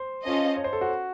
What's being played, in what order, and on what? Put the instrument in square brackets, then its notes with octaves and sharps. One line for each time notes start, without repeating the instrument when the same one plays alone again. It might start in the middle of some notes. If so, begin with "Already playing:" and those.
Already playing: [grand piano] C5
[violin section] C#4 F4 A4 D#5
[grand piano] C#5
C5
A4
F#4